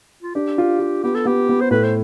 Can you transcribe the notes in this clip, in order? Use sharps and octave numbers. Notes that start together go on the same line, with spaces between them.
F4
D4 G4
F4
F4
B3 G4
A4
B3 G4
B3
C5
A2 B4
C5